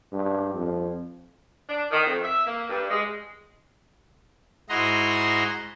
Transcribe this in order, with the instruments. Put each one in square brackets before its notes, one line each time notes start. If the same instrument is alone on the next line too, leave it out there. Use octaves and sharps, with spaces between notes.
[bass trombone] G2
F2
[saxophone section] D4
D#3
F2
E5
A#3
G2
G#3
[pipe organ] G#2 E4 F#4 D#5 A#5 C6